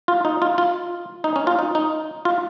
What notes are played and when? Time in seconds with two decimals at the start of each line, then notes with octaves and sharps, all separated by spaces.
0.08 F4
0.25 D#4
0.42 F4
0.58 F4
1.24 D#4
1.36 C#4
1.47 F4
1.59 D#4
1.75 D#4
2.25 F4